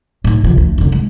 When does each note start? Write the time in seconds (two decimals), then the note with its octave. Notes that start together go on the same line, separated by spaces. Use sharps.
0.24 A2 D#3
0.44 C#3 F3
0.57 D2
0.78 F1 D3
0.92 G#3